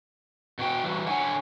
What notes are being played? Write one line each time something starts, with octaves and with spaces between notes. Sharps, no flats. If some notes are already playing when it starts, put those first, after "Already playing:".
B2 F#4 G5
E3 G3 F#4
D3 C#5 F#5 G#5